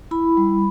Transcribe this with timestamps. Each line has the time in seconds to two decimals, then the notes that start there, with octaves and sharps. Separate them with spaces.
0.11 E4 B5
0.37 G3